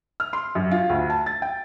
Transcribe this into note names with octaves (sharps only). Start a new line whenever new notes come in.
F6
C6
F#2
F4
D2
A5
A6
G5